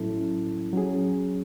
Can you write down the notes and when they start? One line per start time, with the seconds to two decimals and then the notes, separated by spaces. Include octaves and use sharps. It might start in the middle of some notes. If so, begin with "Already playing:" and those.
Already playing: A2 F#3 C#4 E4 A4
0.73 F#3 C#4 G#4